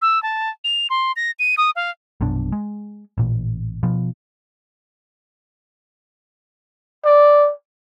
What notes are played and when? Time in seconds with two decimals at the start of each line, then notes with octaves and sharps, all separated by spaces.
0.02 E6
0.23 A5
0.64 F7
0.90 C6
1.16 A#6
1.39 D#7
1.58 D#6
1.76 F5
2.21 A#1 F#2 B2 D4
2.52 G#3
3.18 A1 A#2
3.83 B2 F3
7.05 D5